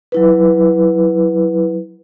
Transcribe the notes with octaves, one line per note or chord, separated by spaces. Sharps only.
F#3 E4 B4